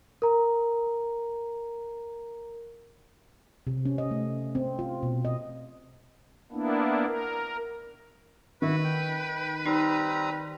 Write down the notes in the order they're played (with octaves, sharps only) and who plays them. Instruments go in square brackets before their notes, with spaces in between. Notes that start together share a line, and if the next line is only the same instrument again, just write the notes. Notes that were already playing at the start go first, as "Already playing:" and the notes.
[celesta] A#4 A#5
[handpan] C3
C#4
D#5
A3
C4
F4
B2
D#5
[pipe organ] A#3 B3 D4 E4
A#4
[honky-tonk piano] D#3 [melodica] E4 F#4 [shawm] B4
[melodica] G5
[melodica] G3 C4 A#5 [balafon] D#4